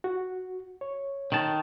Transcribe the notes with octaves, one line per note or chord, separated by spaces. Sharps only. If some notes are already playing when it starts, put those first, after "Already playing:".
F#4
C#5
D#3 A5